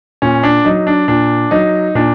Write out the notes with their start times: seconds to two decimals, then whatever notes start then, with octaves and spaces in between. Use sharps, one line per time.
0.22 A#2 C#4
0.43 D4
0.65 F#3 D#4
0.87 D4
1.08 A#2 D4
1.51 F#3 D#4
1.95 A#2 D4